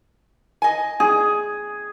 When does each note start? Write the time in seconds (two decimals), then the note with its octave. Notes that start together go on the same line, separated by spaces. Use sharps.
0.62 D#5 G#5
1.00 G#4